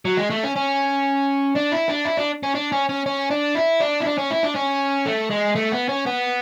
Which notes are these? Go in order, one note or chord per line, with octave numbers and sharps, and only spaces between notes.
F#3
G#3
A3
C#4
C#4
D4
E4
D4
E4
D4
C#4
D4
C#4
C#4
C#4
D4
E4
D4
E4
D4
C#4
E4
D4
C#4
A3
G#3
A3
B3
C#4
B3